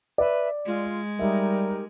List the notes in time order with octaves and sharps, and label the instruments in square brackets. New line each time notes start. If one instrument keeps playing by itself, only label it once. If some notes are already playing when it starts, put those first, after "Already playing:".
[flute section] B4 E5 [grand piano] D5
[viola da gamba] G#3 [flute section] F4
[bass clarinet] G3 [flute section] D#4 G4 A#4 [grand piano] E5